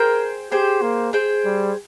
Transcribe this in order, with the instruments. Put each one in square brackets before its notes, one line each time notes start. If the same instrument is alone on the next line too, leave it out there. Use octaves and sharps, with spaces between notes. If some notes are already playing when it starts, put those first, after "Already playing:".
Already playing: [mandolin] G#4 C5 G5 [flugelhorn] A#4
[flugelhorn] G4 [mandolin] G#4 C5 G5
[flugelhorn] A#3
[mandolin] G#4 C5 G5
[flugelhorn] G3